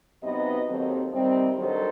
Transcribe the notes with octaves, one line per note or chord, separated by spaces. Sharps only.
C3 F#3 B3 D#4 B4 D#5
D#2 D#3 F#3 C4 A4 C5
C3 D#3 G3 C4
G2 D#3 F#3 A4 C5